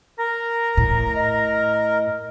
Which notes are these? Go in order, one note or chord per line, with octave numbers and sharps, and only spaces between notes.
A#4 A#5
A2
D#5